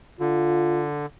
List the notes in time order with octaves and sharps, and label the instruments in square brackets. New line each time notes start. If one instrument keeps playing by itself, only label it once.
[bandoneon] D3 [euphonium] F4